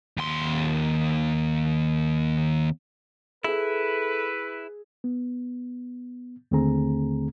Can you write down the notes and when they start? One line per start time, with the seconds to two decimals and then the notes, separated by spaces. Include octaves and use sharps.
0.17 D#2 C6
3.44 E4 G#4 A4 B4 E6
5.04 B3
6.51 D#2 D3 A3 C4 G#4 A#5